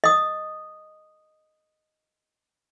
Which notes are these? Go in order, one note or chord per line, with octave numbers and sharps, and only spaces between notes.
D#5 D#6